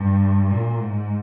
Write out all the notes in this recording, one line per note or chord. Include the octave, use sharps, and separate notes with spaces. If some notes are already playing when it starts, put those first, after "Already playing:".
Already playing: G2
A#2
G#2